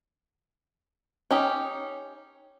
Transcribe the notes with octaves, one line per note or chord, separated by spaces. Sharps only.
C#4 D#4 G4